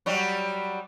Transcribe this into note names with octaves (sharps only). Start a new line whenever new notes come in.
F#3 G3